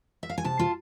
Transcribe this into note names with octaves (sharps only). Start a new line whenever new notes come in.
E5
F5
G#5
C3 A5
F4